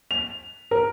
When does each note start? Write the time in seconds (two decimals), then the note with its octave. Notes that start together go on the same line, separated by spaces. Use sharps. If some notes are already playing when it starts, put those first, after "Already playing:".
0.11 F7
0.71 A#4